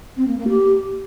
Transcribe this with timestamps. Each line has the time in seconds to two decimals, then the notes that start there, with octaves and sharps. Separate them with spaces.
0.17 C4
0.27 A#3
0.38 A#3
0.49 G4